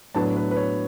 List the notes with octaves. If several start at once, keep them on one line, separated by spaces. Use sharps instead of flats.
A2 F#3 B3 D4 A5
B4
B4
C#5